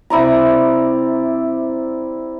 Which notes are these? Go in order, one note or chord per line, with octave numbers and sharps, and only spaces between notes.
C3 E4 D5 A#5